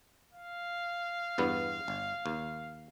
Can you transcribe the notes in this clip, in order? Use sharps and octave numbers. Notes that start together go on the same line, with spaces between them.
F5
E2 G2 B3
G1
D#2